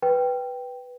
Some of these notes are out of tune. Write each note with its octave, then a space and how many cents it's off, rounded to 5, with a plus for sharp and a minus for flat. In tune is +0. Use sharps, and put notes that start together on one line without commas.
B4 +0 G5 +0